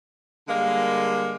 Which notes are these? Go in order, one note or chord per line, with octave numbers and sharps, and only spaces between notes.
D3 G3 G#3 A#3